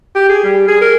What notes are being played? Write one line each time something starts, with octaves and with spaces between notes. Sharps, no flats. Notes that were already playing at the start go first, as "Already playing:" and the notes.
G4
G#4
G3
G#4
A#4